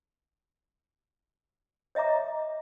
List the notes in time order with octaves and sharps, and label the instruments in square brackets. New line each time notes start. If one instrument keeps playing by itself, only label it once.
[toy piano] C#5 D#5 E5 A#5 D6